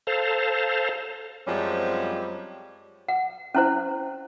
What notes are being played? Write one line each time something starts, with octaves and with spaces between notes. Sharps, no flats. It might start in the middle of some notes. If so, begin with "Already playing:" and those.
A4 C5 F5 A5 A#5
F#2 F3 G3 G#3 C4 C#4
F#5
C#4 E4 C5